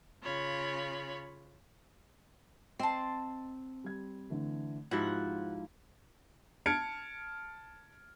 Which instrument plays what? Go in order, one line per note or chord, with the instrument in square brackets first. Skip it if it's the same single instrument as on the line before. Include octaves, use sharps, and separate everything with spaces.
[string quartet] C#3 F4 C#5 B5
[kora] C4 [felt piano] D#5 [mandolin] A5 C6
[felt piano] G3 G#6
D3 E3 A3
[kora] G#2 F3 E4 [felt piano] F#4 G4 F5 [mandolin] F#5
[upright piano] A5 F6 G#6 C#7 D7